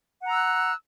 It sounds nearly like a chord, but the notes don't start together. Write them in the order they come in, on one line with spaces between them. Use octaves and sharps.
F#5 A#5 E6 F#6